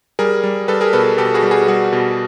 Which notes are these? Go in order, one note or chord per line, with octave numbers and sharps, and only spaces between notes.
G3 G#4 A#4
G3
G3 A4 B4
G#4 A#4
B2 A4 B4
B2 G4 A4
F#4 G#4
G3
F#4 G#4
G3 F#4 G#4
B2